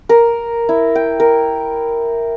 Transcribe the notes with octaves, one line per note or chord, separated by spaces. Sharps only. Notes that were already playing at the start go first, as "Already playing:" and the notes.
A#4
E4
G5
A#4